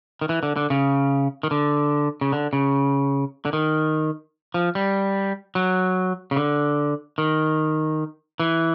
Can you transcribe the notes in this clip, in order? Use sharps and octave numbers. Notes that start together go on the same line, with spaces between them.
D#3
E3
D3
D3
C#3
D#3
D3
C#3
D3
C#3
D3
D#3
F3
G3
F#3
C#3
D3
D#3
E3